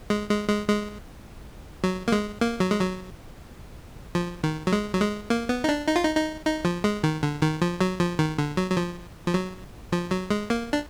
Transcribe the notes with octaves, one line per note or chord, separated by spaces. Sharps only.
G#3
G#3
G#3
G#3
F#3
A#3
G#3
A#3
F#3
G#3
F#3
F3
D#3
F#3
G#3
F#3
G#3
A#3
B3
D#4
D4
D#4
F4
D#4
D#4
D#4
F3
G#3
D#3
D3
D#3
F3
F#3
F3
D#3
D3
F#3
F#3
F3
F3
F#3
F3
F#3
G#3
A#3
D4